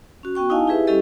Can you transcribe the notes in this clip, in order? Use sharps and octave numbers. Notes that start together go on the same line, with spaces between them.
C#4 F#4
B3 F#4 G5 C#6
D#4 E4 D#5 F5 G#5 A5
E4 G4 G#4 B4 E5
G3 C#4 E4 G4 A4 D#5